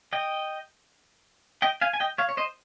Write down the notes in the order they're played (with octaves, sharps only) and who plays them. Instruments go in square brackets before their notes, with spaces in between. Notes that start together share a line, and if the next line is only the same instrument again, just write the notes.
[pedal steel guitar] D#5 G5
D#5 G5
F5 G#5
G#5
D#5 G5
C#5 F5
C#5
C5 D#5